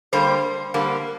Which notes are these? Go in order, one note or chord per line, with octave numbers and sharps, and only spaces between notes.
D3 G3 A#3 C5
D3 G3 A#3